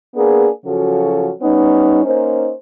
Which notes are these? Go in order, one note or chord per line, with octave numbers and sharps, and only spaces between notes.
A#3 B3 D4 G#4
C#3 F3 F#3 C#4 F#4 A4
G3 B3 C#4 D#4
A#3 C#4 D#4 C5